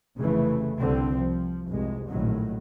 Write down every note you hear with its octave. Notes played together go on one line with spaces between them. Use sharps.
F1 C#3 E3 A3
C2 D3 C4
F3
F1 C2 G#3
A#1 A2 D#3 F#3